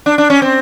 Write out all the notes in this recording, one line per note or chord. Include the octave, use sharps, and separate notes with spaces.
D4
D4
C#4
C4